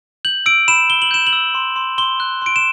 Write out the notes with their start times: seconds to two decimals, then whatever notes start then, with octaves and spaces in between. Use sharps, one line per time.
0.25 G6 F#7
0.46 E6 D7
0.68 B5 E7
0.90 B5 G7
1.02 F#7
1.11 G6 E7
1.27 F#7
1.33 E6
1.55 C6
1.76 C6
1.98 C6 G7
2.20 F#6
2.42 C6 D7
2.56 E7